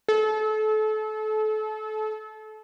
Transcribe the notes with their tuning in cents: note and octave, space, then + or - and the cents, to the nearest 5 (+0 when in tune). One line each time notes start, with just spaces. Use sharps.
A4 -30